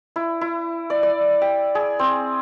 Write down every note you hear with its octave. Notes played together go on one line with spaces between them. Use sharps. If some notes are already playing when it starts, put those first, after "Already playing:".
E4
E4
D5
D5
G5
G#4
C4